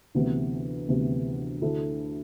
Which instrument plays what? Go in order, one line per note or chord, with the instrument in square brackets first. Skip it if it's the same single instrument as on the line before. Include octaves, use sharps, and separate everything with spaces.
[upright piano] D2 C3 E3 B3
D2 C3 E3 B3
D2 D3 A3 E4 A4